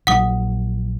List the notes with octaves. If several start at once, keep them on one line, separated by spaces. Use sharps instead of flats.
A#1 F#3 F#5 D#6